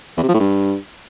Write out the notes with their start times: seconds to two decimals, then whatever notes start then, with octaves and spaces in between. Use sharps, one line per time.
0.17 E2
0.23 C3
0.28 F3
0.34 A2
0.40 G2